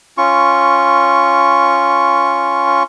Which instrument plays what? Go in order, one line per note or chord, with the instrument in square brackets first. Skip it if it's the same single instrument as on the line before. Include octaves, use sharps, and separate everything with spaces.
[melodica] C#4 F4 C#6